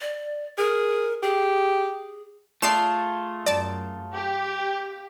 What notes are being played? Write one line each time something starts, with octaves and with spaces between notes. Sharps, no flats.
D5
G#4 A#4
G4 G#4
A3 F4 G#4 D5 C7 E7
F#2 D5 A5
G4